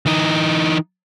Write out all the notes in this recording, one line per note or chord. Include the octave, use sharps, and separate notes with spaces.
E3 D#4